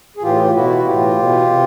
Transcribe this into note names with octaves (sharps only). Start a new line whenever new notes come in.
G#4
A2 E3 F4 G4
F4
B2 E4 F#4
F#4
A2 E3 F4 G4
B2
C3